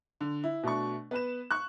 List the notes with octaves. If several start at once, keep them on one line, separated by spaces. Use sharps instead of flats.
D3
E4
B2 A3 D4 C#6
B3 B4 E7
C#6 F#6